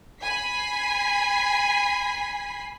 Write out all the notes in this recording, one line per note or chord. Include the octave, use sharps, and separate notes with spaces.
G#5 B5 B6 C7